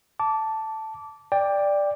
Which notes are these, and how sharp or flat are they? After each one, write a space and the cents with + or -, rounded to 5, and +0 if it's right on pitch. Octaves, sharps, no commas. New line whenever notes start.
A5 +0 D6 -20
D5 +0 G5 +15